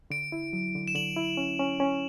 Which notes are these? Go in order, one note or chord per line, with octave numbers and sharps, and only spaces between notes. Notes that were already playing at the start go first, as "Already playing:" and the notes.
D3 D7
E4
F#3
D3
E7
D3 F#7
E4
C#4
C#4
C#4